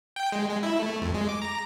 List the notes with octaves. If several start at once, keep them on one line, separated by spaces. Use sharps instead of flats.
G5
G#3
G#3
E4
A3
F2
G#3
D6
A#5